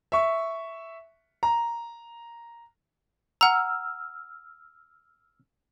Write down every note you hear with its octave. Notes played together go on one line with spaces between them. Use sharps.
E5 C#6
A#5
F#5 A#5 E6 F6